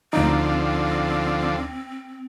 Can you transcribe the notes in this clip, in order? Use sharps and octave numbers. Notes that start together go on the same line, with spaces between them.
D2 D3 F3 C4 D#4